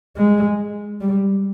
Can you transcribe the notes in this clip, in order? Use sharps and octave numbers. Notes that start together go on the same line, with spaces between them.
G#3
G3